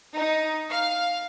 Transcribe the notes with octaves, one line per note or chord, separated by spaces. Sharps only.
D#4
F5